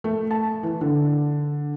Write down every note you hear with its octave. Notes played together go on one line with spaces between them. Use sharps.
A3
A5
E3
D3